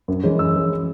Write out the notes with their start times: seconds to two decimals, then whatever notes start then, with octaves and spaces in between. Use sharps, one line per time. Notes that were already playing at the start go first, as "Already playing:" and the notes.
0.08 F#2
0.24 E3 G#3 C#4
0.39 F#2 E6
0.55 E3 G#3 C#4